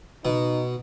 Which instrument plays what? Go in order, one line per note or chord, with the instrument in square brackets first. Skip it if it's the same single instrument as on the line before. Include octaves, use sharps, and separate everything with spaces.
[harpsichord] B2 [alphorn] D#4